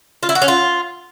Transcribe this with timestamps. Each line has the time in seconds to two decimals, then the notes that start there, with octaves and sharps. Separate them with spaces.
0.23 F4
0.29 E4
0.35 F#4
0.42 C#4
0.48 F4